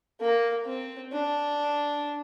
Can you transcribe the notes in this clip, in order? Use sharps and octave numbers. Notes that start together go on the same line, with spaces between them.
A#3
C4
D4